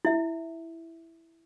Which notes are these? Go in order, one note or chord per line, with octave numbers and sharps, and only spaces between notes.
E4 E5